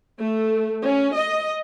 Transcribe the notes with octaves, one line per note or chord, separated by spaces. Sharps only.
A3
C#4
D#5